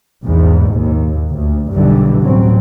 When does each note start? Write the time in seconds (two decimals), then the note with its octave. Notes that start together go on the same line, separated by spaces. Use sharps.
0.25 A#1 E2 G#2 B2
0.73 D#2
1.31 D2
1.72 B1 G2 B2 D3 E3
2.24 A1 D2 F#3 C4